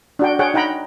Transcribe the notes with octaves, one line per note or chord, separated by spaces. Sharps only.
D4 F#4 G5
G#4 C#5 F#5 G5
D#4 F#5 G5 A#5 B5